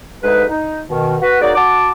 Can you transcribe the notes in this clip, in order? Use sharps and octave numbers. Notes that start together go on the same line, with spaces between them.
D2 G#2 G#3 D#4 G#4 B4
D#4
B2 D#3
F#4 B4
F#3 A#3 D#4 F#4 G#4 D5
F#4 A5 D6